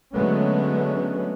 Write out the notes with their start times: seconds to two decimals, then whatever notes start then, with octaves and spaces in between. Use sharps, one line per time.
0.13 D3 F#3 G#3 A3 B3 C#4